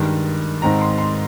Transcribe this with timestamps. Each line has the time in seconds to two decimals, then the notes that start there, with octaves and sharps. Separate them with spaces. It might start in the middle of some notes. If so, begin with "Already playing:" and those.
Already playing: G2 D#3 G#3
0.62 G#2 D#3 G#3 C4 A#5
0.81 C6
0.98 C6